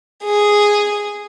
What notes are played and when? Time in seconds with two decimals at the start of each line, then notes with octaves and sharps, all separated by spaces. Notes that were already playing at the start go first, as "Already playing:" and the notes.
0.24 G#4